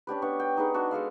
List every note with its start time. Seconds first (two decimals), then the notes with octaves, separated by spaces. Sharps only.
0.07 C#4 D4 G4 B4
0.22 B3 D4 C#5
0.40 G5
0.57 D#4 G#4 B4
0.74 D4 F#4
0.91 G#3 A4 D5 F5